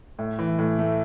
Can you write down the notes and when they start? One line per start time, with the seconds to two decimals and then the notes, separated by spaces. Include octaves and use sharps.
0.19 A2
0.39 E3
0.59 A2
0.79 A3